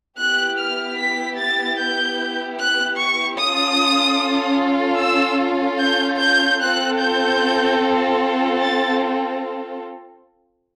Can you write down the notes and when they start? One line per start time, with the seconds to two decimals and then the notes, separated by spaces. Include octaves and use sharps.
0.19 B3 E4 G4 F#6
0.59 F6
1.00 B6
1.40 A6
1.80 G6
2.60 F#6
3.00 C#6
3.40 C#4 F4 A4 D#6
5.00 E6
5.81 G6
6.21 G6
6.61 C4 F4 A4 F#6
7.01 G6
8.62 A6